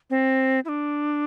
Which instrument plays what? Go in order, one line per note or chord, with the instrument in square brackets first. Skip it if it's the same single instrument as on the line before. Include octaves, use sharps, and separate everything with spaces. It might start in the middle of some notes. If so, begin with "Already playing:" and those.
[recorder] C4
E4
D4